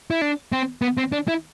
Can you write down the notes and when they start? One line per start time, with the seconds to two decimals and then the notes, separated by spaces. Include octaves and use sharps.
0.11 E4
0.21 D4
0.52 C4
0.82 B3
0.97 C4
1.12 D4
1.28 E4